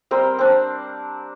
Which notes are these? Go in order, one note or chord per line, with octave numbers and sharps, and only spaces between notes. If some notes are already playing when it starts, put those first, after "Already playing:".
G3 C4 A#4 C6
C4 D4